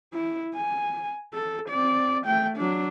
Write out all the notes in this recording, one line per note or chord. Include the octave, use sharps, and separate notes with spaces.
E4
G#5
A4
C4 D5
A3 G5
F#3 D4